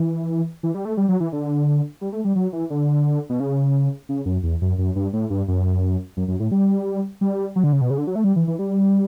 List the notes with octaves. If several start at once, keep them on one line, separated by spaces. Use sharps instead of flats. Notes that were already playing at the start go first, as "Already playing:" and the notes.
Already playing: E3
E3
G3
A3
G3
F#3
E3
D3
G3
A3
G3
F#3
E3
D3
B2
C#3
C#3
F#2
E2
F#2
F#2
G2
A2
G2
F#2
F#2
F#2
A2
G3
G3
F#3
D3
C#3
B2
C#3
D3
F#3
A3
G3
E3
E3
G3